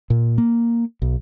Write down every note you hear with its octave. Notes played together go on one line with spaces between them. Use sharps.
A#2
A#3
B1